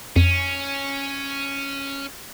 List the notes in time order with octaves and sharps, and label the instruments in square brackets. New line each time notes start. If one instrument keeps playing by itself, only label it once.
[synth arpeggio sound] F2 [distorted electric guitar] C#4